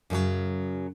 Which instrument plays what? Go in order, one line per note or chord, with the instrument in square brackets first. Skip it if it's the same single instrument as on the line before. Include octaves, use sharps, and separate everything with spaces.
[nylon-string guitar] F#2 C#3 F3 F#3